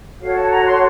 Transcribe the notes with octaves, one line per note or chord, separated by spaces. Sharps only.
F#4 A4 C#5 F5
A5
A#5
C6